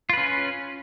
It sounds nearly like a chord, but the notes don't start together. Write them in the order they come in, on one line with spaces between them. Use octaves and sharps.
F4 B4 C#4